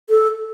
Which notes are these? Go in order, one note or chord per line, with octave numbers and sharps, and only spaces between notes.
A4